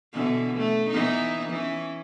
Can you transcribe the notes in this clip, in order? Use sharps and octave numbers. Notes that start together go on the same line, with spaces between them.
B2 D3 E3
A3
E3 B3 D#4
E3 C#4